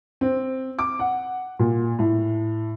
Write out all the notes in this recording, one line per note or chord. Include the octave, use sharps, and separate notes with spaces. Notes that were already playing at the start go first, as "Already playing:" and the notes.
C4
D6
F#5
A#2
A2